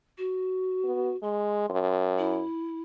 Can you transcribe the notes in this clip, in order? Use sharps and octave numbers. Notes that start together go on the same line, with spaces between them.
F#4
B3
G#3 C6
F#2
E4